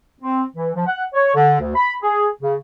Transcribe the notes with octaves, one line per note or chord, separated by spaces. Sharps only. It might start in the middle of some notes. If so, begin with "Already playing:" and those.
C4
E3
F3
F#5
C#5
D3
D2
B5
G#4
C#3